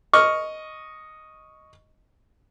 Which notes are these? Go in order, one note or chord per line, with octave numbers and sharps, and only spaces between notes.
D#5 C#6 F6